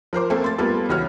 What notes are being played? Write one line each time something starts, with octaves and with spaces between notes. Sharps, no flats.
F3 A#4 C5 D6
A3 A#3 C4 A4
C6 A6
G3 A#3 B3 F4 A4
C#2 E3 F#4 C#5 F6